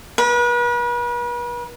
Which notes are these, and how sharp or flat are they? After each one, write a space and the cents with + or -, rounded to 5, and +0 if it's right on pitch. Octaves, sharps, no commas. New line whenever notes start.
B4 -40